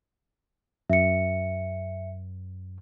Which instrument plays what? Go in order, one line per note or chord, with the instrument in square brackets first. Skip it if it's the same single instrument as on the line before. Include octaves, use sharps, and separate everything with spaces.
[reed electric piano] F#2 [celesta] E5 C#7